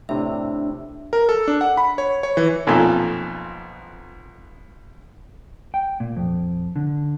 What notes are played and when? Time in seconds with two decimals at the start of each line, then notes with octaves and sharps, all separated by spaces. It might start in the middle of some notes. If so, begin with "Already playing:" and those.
0.09 A2 C3 D4 E5
1.13 A#4
1.29 A4
1.48 D4
1.61 F#5
1.77 B5
1.98 C#5
2.23 C#5
2.37 E3
2.67 B1 F2 A#2 F3 A4 G#5
5.74 G5
6.00 A#2
6.17 F2
6.76 D3